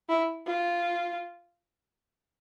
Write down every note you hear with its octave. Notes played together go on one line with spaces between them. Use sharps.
E4
F4